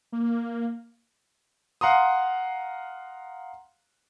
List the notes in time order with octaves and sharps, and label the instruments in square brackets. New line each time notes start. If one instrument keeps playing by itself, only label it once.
[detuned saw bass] A#3
[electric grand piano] F5 F#5 A#5 C6 D#6